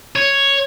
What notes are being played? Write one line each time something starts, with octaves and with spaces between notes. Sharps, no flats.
C#5